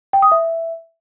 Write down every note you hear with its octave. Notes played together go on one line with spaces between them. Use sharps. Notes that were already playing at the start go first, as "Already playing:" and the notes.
G5
D#6
E5